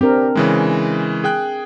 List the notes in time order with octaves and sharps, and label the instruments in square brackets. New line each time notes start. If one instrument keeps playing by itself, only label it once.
[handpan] C4 D4 A#4 [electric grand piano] G4
[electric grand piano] C#3 E3 G#3
G#4 G5 F#6